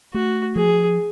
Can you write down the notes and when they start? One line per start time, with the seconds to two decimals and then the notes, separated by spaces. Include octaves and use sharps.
0.14 A3 F#4
0.56 F3 G#4